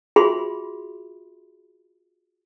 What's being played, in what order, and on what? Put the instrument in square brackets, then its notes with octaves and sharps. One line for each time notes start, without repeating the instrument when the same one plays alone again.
[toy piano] F4 F#4 G#4 E5 B5 C6